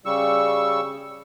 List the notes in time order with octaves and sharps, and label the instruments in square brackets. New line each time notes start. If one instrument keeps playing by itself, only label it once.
[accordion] C#3 G3 C#6 E6